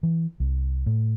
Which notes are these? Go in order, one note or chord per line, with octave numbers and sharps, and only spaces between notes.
E3
C2
A2